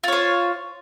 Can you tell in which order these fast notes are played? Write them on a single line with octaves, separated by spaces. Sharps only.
F4 C#5 C5